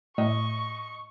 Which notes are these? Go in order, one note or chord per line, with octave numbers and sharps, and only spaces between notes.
A2 D#5 C#6